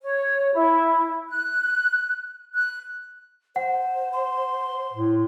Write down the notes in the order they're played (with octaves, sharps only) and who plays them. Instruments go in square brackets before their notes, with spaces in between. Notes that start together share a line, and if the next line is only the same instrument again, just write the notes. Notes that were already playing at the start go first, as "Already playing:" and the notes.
[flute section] C#5
E4
F#6
F#6
[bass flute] C5 [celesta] F#5
[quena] C6
[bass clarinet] A2